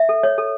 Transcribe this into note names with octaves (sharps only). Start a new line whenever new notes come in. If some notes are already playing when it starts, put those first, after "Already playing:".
Already playing: E5
A4
C#5
A4